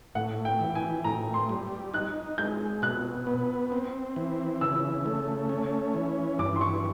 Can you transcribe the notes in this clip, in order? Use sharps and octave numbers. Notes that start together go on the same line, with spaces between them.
A2 F#5
G5
E3
G#5
A2 A#5
C6
G3
D#4 F#6
G#3 G6
B2 F#6
B3
C4
E3
C#3 E6
A3
C#4
E3
G2 D6
C6
C#6